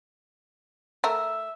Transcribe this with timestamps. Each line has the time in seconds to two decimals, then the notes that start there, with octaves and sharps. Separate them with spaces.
1.04 A3 A#4 E5